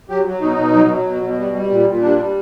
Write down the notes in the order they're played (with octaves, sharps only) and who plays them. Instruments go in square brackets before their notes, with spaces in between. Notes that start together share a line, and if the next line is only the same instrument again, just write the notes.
[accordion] F#3 G4
F#3
B2 D#4
B2
F#3
F#3
B2
B2
G3
G3
A#2
A#2
G3 D4
G3